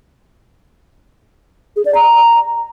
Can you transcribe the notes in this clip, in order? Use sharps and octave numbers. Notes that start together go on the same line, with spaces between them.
G#4
D5
A#5